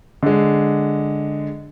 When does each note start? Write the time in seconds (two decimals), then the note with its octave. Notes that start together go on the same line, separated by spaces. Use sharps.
0.23 D3 G#3